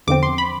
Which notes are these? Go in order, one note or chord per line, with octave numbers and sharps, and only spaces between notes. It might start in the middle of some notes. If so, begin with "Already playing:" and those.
E2 D3 F3 C4 D6
C6
B5